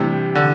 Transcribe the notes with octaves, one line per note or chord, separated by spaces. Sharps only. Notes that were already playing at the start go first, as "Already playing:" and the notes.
Already playing: A2 C3 E3 G3 D4 G4
D3